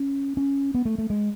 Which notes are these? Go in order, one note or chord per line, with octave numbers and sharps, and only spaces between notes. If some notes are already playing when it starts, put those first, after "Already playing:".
Already playing: C#4
C#4
B3
A3
A3
G#3